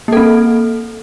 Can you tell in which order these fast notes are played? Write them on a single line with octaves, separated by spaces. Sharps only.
A#3 A4 C4